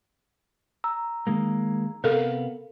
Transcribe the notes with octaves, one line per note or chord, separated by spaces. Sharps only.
A#5 E6
D#3 G#3 A#3
C3 B3 A4 A#4 F5